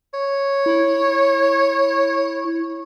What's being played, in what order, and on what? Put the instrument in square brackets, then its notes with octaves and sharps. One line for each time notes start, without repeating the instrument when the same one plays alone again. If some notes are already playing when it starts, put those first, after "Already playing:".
[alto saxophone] C#5
[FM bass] E4